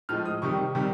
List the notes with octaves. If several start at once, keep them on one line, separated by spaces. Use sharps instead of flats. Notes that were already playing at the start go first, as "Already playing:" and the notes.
A2 F3 G#3 F6
D#6
C3 D#3 G3 C#6
C3 D#3 G3